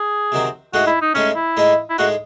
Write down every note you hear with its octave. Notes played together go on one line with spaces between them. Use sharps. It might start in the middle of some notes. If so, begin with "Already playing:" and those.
Already playing: G#4
C3 D#3 F#3 C4
A2 G#3 D#4 F#4 G#4
E4
D#4
A2 G#3 C#4 D#4 G#4
E4
A2 G#3 D#4 G#4
E4
A2 G#3 D#4 F#4 G#4